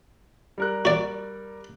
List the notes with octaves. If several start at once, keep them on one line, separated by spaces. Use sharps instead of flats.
G3 A#4 F#6
F#4 D5